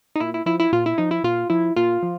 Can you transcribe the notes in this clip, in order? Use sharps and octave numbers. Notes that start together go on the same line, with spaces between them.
D#4
A#2 E4
E4
F3 E4
E4
A#2 F4
E4
F3 D#4
E4
A#2 F4
F3 E4
A#2 F4
F3